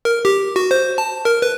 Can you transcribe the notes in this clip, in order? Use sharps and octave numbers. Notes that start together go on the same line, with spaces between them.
A#4
G4
F#4
C5
A5
A#4
B4